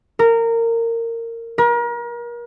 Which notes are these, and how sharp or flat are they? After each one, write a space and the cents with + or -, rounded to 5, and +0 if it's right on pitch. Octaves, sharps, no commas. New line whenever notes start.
A#4 -20
A#4 +35